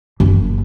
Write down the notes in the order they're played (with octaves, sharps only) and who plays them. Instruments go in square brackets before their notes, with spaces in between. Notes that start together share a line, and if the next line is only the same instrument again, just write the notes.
[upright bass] F#1